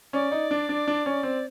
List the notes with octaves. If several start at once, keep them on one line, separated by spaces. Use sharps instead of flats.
C#4 D5
D#4
D4
D4
D4
C#4
C4